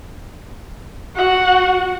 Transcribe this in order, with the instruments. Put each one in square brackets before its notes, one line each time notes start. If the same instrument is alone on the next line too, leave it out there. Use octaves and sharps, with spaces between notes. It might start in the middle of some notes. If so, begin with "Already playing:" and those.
[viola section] F#4 [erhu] F#5